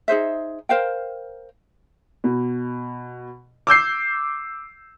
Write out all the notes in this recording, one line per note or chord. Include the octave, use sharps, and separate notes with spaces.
D#4 G#4 C5 E5
A#4 C5 F5 G5
B2
D6 E6 G6 C7